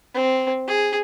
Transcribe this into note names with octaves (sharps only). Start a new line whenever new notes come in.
C4
G#4